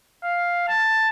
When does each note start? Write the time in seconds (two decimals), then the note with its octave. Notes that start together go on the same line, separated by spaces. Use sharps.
0.24 F5
0.69 A5